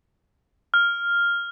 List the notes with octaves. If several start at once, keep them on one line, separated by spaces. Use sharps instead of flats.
F6